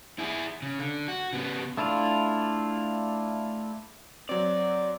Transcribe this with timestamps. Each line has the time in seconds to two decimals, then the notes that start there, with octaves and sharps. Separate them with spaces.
0.19 E4 G#4
0.62 C#3
0.79 D3
1.08 F#4
1.33 C#3 B3
1.77 A3 D4 E4 F4
4.29 F#3 C4 D5